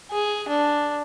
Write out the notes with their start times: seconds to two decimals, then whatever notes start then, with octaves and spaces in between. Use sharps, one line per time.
0.11 G#4
0.48 D4